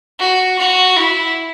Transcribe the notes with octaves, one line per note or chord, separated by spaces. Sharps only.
F#4
F#4
E4